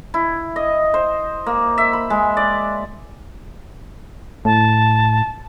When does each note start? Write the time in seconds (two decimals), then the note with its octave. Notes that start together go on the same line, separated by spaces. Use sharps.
0.14 E4
0.56 D#5
0.94 C5
1.46 A#3
1.78 E5
1.93 B5
2.10 G#3
2.37 D5
4.45 A2 A5